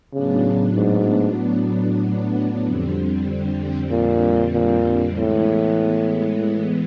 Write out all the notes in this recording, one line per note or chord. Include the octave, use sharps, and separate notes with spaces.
A2 C#3 F#3 B3 D4
G#2
F2 D3 G3 C4
A#2
A#2
A2 E3 G#3 B3